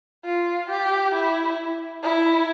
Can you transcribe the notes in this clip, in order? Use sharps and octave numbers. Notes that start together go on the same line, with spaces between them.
F4
G4
E4
E4